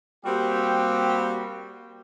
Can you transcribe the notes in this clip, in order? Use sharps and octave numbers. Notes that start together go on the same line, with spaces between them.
G3 A#3 C4 F#4 G4